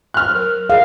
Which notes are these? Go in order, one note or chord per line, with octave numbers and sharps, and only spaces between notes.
F6 F#6
F#3 A#4
G#4 A#4 F5